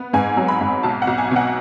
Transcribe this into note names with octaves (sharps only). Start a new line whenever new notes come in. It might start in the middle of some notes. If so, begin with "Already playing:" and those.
Already playing: B3
G#2 G#5
F#3
B5
G#2
B1 A5
F#5
B1
G#5
B2 F#5